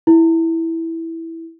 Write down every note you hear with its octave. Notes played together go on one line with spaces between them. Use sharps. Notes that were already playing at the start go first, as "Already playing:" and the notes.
E4